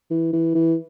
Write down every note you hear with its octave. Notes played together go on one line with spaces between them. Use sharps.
E3
E3
E3